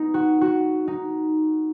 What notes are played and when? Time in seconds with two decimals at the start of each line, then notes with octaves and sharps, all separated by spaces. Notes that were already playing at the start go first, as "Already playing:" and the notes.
Already playing: B3 D#4
0.14 F#4
0.41 F#4
0.88 D#4